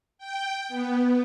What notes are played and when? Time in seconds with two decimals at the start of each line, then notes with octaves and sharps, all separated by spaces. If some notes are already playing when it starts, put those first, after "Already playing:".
0.18 G5
0.68 B3